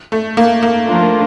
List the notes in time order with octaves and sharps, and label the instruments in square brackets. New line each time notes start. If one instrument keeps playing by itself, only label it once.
[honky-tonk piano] A3
A#3
A#3
[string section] F3 A3 D4 F4 A#4